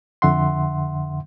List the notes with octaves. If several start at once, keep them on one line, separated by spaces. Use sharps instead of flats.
F2 D3 E5 F#5 C6